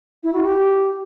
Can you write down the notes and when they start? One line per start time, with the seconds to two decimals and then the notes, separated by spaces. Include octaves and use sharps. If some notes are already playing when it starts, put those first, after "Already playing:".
0.23 E4
0.33 F#4
0.42 G4